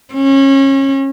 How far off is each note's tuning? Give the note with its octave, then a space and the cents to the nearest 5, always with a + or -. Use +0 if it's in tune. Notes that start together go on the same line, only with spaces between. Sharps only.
C#4 -30